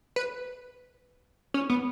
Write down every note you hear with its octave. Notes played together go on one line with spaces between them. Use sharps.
B4
C#4
B3